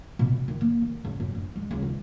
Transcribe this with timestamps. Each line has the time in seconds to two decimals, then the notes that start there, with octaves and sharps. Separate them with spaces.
0.19 B2
0.33 F#2
0.48 D#3
0.61 A#3
0.82 D#3
1.05 C#2
1.20 F#2
1.35 D4
1.56 G#3
1.71 C#2
1.82 D#3